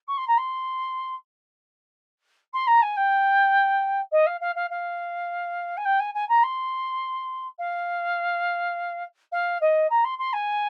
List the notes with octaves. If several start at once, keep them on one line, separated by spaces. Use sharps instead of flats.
C#6
C6
A#5
C6
C6
A#5
G#5
G5
D#5
F5
F5
F5
F5
G#5
G5
G#5
G#5
A#5
C6
F5
F5
D#5
A#5
C6
C6
G#5